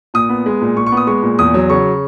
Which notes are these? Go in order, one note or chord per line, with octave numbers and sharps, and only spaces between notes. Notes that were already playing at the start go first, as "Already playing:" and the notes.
A#2 D#6
B3
G#3
A#2
A#2 C#6
C#6
B3
D#6
G#3 C#6
A#2
E2 D#6
F#3
C#3 C#6